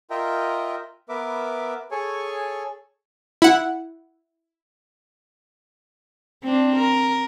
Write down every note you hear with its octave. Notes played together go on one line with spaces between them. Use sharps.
F4 A#4 D#5 E5 G5 A#5
B3 A#4 B4 E5 D6
G#4 A4 C#5 G#5 C#6
E4 F#5
C4 D4
A#4